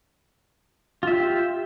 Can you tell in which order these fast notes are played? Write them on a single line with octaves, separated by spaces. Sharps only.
F4 E5 G4